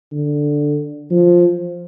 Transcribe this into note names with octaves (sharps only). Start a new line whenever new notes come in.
D3
F3